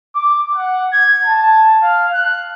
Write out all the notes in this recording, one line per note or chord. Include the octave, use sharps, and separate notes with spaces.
D6
F#5
G#6
A5
F5
F#6